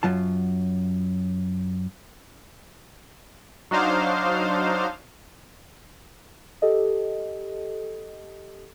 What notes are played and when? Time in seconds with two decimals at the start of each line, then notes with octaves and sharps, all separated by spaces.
0.03 F#2 F#3 F4 A5
3.71 F#3 D4 D#4 C5 F5
6.62 G4 A4 D#5